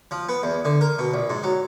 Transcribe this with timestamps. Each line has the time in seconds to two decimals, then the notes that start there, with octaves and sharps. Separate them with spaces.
0.11 F3
0.29 B3
0.43 E2
0.65 D3
0.81 A#4
0.99 B2
1.14 A#1
1.30 G#2
1.43 F#3